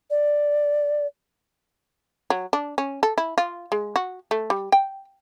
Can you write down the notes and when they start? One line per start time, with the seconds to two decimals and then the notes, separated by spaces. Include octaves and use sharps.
0.10 D5
2.30 F#3
2.53 D4
2.78 C#4
3.03 A4
3.18 E4
3.38 F4
3.72 G#3
3.96 F#4
4.31 A3
4.50 G3
4.72 G5